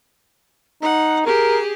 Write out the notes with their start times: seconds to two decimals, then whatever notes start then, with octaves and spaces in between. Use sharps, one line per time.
0.83 D#4 F#5
1.26 G4 G#4 A#4